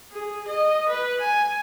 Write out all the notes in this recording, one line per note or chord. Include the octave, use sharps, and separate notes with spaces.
G#4
D#5
B4
G#5